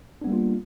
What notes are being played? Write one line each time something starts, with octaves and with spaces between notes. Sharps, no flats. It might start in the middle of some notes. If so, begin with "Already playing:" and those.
G3 A#3 B3 D4 F4